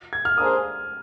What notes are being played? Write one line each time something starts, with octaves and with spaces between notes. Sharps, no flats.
G#6
F6
A#3 D4 G#4 C5 D#6